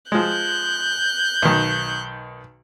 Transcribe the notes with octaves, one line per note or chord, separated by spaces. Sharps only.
F3 G#3 F#6 G6
B1 D#3